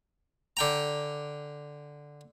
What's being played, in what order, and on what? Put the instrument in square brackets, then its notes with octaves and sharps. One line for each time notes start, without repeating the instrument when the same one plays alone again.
[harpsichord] D3 G5 A#5